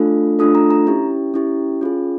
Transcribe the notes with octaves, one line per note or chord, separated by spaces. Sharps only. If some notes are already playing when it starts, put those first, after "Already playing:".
Already playing: A3 D4 F4 A4
A3 D4 F4 A4 D#6
A#5
A#5
C#4 E4 G4
C#4 E4 G4
C#4 F4 G#4